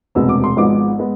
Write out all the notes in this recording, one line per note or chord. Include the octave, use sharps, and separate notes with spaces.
E1 D2 C3 G#3 B3 E6
D6
C6
G#1 G#2 F3 G#3 B3 D6
G#3 B3